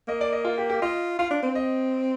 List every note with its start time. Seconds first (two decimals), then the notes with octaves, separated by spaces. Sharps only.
0.08 A#3 D#5
0.21 D5
0.33 D#5
0.45 F4
0.58 G4
0.69 G4
0.82 F4 D#5
1.19 F4 F5
1.31 D4
1.43 C4
1.55 D#5